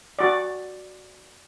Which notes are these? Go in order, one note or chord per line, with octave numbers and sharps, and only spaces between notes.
F#4 D5